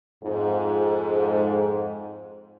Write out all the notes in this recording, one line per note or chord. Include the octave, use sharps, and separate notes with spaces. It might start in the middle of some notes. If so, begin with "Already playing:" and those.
F2 G#2